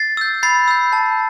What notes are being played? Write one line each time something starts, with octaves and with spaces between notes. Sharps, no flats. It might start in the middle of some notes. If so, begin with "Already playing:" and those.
Already playing: A6 C7
E6 G6
B5 A6 C7
E6 G6
A5